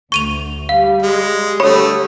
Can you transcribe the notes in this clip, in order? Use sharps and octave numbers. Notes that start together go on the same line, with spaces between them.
D2 C#6 D#7 F7
G3 F5
G#3
D3 G3 A3 C#5 B5 D#6